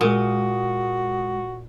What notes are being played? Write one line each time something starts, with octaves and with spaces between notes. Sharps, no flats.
A#2 G#3 F#4 D#6